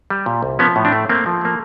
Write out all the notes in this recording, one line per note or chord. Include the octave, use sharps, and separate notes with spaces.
G3
A#2
C2
F3 B3 C#4
A2
C4 D4
A3
A3 A#3 C4
F3
A3 A#3